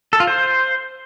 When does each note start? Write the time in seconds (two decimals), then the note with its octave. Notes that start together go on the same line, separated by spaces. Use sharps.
0.13 A4
0.20 F4
0.27 C5